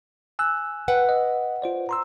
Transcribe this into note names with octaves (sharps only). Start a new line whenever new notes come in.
G#5 E6 F#6
B4 F#5 G5
D#5
F4 C5 D5
A#5 C6 E6